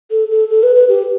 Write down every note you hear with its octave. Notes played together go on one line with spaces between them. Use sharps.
A4
A4
A4
B4
B4
G4